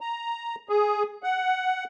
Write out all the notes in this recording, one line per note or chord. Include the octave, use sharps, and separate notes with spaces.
A#5
G#4
F#5